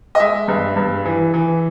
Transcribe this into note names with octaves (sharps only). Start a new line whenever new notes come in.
D#5
G#3 E5
G2
G2
E3
E3